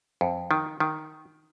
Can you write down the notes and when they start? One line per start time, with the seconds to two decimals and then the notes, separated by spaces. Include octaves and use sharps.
0.21 F2
0.51 D#3
0.80 D#3